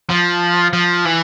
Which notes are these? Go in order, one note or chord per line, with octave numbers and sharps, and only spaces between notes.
F3
F3
E3